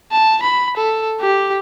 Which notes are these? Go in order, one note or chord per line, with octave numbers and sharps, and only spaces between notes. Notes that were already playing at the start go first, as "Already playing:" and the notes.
A5
B5
A4
G4